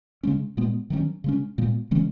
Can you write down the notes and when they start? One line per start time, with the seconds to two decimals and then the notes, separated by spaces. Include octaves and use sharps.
0.23 C#3 G#3 C#4
0.57 A#2 G#3 B3
0.90 D#3 F#3 A#3 C#4
1.24 C#3 G#3 C#4
1.58 A#2 G#3 B3
1.91 C#3 E3 G#3 C#4